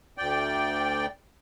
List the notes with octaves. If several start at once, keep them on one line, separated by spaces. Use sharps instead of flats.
D2 D5 G5